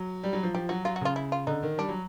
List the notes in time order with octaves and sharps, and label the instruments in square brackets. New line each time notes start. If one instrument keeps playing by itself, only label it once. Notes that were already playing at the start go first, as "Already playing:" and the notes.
Already playing: [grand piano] F#3
G3
F#3
F3
[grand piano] F3 [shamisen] G4
[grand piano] F#3 [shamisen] F#4
[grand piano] F#3 [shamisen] F4
[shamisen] F#4
[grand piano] C#3 [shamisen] F4
[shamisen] E4
F4
[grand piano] D3 [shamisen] D#4
[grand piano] D#3
[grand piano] G3 [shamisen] D4
[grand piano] F#3